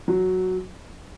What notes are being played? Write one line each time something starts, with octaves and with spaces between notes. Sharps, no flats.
F#3